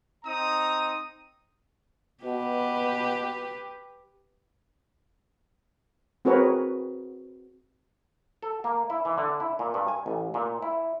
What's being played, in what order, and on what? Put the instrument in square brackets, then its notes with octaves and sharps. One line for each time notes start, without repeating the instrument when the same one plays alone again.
[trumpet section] C4 D#4 A#5 D#6
[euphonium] B2 [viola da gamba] G4 B4
[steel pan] C4 F#4 G#4 A#4 B4 C#5
[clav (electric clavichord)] A4
A#3
E4
E3
D3
E4
A#2
G2
G#5
A1
A#2
E4